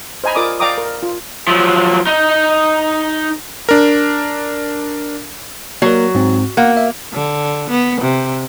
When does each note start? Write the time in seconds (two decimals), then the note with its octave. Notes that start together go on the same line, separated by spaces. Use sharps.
0.24 C5 D#5 G#5 A#5 B5
0.35 F4 A#4 D5 D6 D#6
0.60 D5 F5 G5 A#5 D6 D#6
0.78 A#4
1.03 F4
1.47 F3 F#3
2.07 D#4
3.69 D4 A#4
5.82 F#3 A#3 A#4
6.15 G#2 C4
6.57 A#3 F#5
6.77 E5
7.13 D3
7.70 B3
8.01 C3